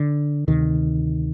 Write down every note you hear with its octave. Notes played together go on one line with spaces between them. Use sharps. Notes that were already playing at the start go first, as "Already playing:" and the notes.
Already playing: D3
D2 C3 D#3